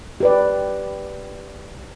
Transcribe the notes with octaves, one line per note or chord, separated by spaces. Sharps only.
G4 B4 D5